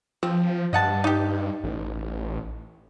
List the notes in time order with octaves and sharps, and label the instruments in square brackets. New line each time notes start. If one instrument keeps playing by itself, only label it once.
[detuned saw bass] F3 [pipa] C4
[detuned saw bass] G2 [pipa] D#5 F#5 A5
[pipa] D#4 G4
[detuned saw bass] A1